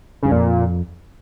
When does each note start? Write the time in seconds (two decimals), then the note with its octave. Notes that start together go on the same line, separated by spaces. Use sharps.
0.23 G2 C#3
0.32 F2 A#2